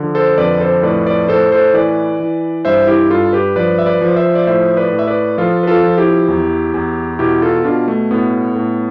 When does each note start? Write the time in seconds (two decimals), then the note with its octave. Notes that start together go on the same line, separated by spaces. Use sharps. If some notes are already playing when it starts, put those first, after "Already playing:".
Already playing: D3 F3
0.15 A4 C5
0.38 F2 B4 D5
0.60 A4 C5
0.83 A2 B4 D5
1.07 B4 D5
1.28 A2 A4 C5
1.52 A4 C5
1.74 E3 B4 D5
2.20 E3
2.65 G2 C5 E5
2.87 E4 G4
3.10 G2 F4 A4
3.33 G4 B4
3.56 F3 B4 D5
3.79 E5
3.86 B4 D5
4.01 F3
4.16 C5 E5
4.35 D5
4.47 A2 C5 E5
4.77 B4 D5
4.92 A2
4.99 E5
5.07 B4 D5
5.38 F3 F4 A4
5.63 B4
5.67 F4 A4
5.83 F3
5.98 E4 G4
6.28 E2
6.74 E2
7.19 B2 E4 G4
7.42 F4 A4
7.64 B2 D4 F4
7.88 A3
8.11 A2 B3
8.55 A2